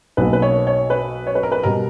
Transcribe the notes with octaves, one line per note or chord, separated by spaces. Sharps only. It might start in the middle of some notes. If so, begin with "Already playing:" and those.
B1 B2 A#3 B4
B4
C#5
C#5
B4
C#5
B4
A#4
B4
B2 G3 A#4